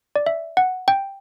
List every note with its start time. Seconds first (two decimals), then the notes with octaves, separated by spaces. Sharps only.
0.16 D5
0.26 E5
0.57 F#5
0.88 G5